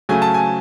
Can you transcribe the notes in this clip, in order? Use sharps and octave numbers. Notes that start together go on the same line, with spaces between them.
C#3 F#3 A3 G#5
A5
G#5